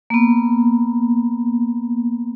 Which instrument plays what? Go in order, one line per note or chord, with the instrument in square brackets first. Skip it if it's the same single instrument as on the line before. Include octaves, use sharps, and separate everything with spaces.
[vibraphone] A#3 B3